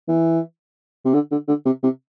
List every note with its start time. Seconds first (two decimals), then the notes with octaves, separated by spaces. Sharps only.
0.08 E3
1.05 C3
1.14 D3
1.31 D3
1.48 D3
1.65 C3
1.83 C3